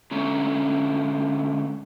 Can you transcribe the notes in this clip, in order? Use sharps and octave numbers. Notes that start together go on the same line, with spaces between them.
D3 G#3 A3 C#4 A#5